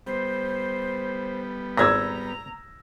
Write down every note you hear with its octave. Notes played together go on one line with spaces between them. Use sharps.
G3 B3 C5
G#1 A#2 A#5 E6 G#6 A#6